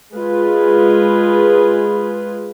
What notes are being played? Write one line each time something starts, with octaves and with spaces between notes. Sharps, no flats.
G#3 F4 G#4 B4